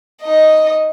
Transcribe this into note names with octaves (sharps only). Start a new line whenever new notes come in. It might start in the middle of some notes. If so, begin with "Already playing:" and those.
D#4 D#5